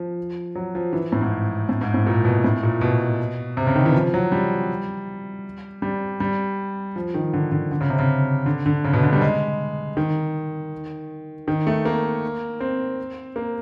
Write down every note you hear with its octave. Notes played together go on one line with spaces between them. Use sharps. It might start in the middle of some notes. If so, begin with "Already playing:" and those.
Already playing: F3
F#3
F3
E3
A2
G#2
A2
G#2
A2
A#2
B2
A2
A#2
B2
C3
C#3
D#3
E3
F3
F#3
G3
G3
G3
F3
D#3
D3
D3
D3
C#3
C3
C#3
D3
D3
C#3
B2
D3
G3
G#3
D#3
D#3
A3
A#3
C4
A#3